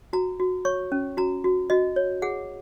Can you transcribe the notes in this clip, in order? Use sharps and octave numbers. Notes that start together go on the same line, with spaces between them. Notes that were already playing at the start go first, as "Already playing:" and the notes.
F#4 A#5
F#4
C#5 C#6
C#4
F#4 A#5
F#4
F#4 D#5
C#5
G#4 F#5